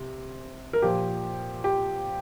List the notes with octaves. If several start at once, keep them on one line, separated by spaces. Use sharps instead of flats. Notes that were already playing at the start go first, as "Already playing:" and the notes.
Already playing: C3
A#4
A#2 F3 G4
G4